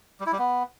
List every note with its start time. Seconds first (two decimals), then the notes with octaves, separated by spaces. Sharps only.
0.20 G3
0.26 E4
0.32 G3
0.39 B3